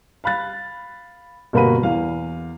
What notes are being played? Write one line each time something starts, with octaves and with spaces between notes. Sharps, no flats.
F5 B5 F#6 A6
G1 B2 A#3 F#4 B5 D#7
E2 F5